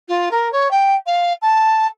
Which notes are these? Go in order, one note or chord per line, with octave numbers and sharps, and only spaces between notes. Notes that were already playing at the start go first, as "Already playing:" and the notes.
F4
A#4
C#5
G5
F5
A5